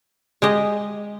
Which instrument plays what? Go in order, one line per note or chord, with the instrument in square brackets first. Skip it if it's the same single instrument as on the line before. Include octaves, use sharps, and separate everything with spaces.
[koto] G#3 G4 D#5